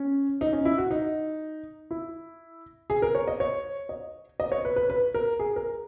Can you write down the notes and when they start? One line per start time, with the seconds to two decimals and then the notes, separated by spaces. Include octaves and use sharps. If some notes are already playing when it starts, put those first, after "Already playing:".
Already playing: C#4
0.41 D#4
0.53 C#4
0.65 E4
0.78 F#4
0.91 D#4
1.91 E4
2.90 G#4
3.02 A#4
3.15 C#5
3.28 D#5
3.40 C#5
3.89 D#5
4.40 D#5
4.52 C#5
4.65 B4
4.76 B4
4.90 B4
5.14 A#4
5.39 G#4
5.56 A#4